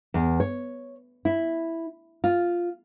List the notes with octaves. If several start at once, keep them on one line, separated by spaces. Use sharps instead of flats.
E2
C#5
E4
F4